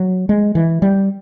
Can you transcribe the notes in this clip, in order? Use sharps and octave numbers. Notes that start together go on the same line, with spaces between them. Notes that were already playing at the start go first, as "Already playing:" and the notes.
Already playing: F#3
G#3
E3
G3